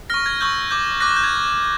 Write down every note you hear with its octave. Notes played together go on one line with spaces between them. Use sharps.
C#6 F6 A#6
G#6
C#6 E6 G6
D6 G6
D6 F#6 A#6
G6
G#6